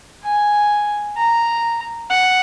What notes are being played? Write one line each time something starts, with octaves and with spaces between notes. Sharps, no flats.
G#5
A#5
F#5